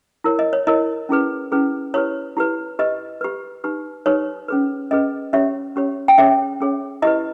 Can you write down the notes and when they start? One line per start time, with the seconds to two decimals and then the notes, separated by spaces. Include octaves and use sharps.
0.24 E4 A#4 C#5
0.39 D#5
0.53 C#5
0.67 E4 A#4 C#5 D#5
1.09 C#4 E4 G#4 B4
1.52 C#4 E4 G#4 B4
1.94 E4 G4 B4 C#5
2.37 E4 G4 B4
2.79 G4 B4 D#5
3.21 G4 B4
3.64 D#4 G4 B4
4.06 D#4 G4 B4 C#5
4.48 C#4 G#4 B4
4.91 C#4 G#4 B4 D#5
5.33 C#4 G4 C#5 E5
5.76 C#4 G4 C#5
6.08 G5
6.18 C#4 G#4 C#5 E5
6.60 C#4 G#4 C#5
7.02 E4 G4 B4 D#5